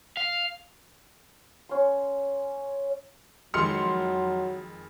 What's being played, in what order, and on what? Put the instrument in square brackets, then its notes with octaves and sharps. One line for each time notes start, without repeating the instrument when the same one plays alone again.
[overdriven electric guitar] F5
[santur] C#4 C6
[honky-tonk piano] F2 D#3 G#3 [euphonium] F#3 [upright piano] C6 F6 C#7